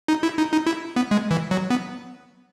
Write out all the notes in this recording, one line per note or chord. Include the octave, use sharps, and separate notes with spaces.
D#4
E4
D#4
D#4
E4
B3
G#3
E3
F#3
B3